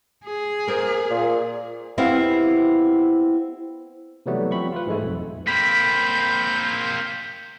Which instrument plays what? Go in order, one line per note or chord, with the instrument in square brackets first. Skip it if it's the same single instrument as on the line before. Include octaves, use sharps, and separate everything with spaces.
[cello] G#4
[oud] A#3 C4 A#4
[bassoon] A#2
[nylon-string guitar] B3 C4 E4 G4 F5
[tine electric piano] C3 E3 F#3 G3 A3 B3
F3 C4 B5 C#6
F4 B4
G#2 E3 G#3 A3 E4
B1 F2
[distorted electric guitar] A#3 C4 [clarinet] B5 [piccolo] G6 [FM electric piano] B6